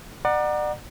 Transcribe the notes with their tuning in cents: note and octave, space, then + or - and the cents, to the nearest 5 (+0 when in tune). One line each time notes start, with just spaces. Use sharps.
D5 +35 F#5 +0 A#5 +20